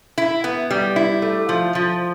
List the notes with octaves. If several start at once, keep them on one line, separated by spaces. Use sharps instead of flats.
E4
B3
G3
E4
A3
F3
F3